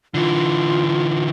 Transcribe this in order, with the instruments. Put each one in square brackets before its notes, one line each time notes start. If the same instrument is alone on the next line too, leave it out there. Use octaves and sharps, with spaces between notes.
[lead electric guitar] D3 E3 [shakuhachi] F4